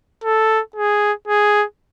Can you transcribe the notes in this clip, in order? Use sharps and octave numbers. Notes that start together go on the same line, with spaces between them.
A4
G#4
G#4